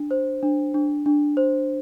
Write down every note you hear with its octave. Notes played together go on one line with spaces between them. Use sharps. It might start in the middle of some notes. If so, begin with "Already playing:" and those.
Already playing: D4
C5
D4
D4
D4
C5